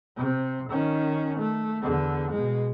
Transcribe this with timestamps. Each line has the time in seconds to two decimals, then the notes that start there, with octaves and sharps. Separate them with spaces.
0.17 C3
0.69 D#3 C#4
1.39 A3
1.83 E2 D3
2.31 B2 G#3